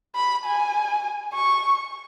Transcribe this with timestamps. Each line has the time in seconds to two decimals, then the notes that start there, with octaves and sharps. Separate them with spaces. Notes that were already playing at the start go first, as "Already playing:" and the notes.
0.16 B5
0.46 G#5
1.34 C#6